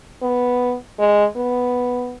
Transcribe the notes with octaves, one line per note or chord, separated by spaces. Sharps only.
B3
G#3
B3